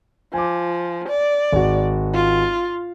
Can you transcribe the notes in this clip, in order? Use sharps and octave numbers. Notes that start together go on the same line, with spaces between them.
F3 G#5 D6
D5
G#1 F#4
F4